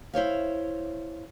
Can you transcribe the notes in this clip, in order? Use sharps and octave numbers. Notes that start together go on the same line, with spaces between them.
E4 C5 C#5 F5